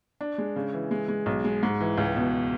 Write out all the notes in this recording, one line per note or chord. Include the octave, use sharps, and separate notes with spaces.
D4
G#3
C#3
E3
G#3
G#3
B1
G#3
G#2
E3
C#2
B2